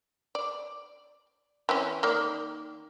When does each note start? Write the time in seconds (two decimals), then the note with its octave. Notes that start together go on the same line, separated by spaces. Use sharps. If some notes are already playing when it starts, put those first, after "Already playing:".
0.35 D5
1.69 E3 C4 C#4
2.03 D#3 A#3 D5